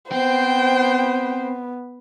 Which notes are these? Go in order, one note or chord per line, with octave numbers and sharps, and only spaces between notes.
B3 C4 C5 G5